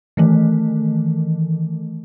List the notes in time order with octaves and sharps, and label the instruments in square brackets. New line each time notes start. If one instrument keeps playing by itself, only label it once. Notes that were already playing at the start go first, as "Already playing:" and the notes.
[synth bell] D#3 E3 A3